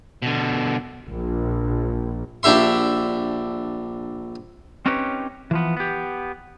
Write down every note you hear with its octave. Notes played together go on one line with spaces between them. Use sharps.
B2 D3
A#1
A#1 D4 G4 E5 C6
C4 C#4 D#4 G4 B4 C#5
E3 F3 B3
B3 G4